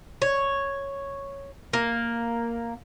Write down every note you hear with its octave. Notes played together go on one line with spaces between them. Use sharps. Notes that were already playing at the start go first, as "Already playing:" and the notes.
C#5
A#3